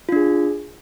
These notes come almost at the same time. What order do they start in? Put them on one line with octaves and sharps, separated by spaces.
F4 D4 G#4